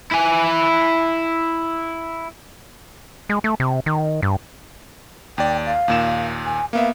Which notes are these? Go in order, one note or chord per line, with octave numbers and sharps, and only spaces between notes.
E4 G#5
G#3
A3
C3
D#3
G2
D#2 D5 G5
F5
D#2 A#2 E7
G#5
A#3 B3 E5 F5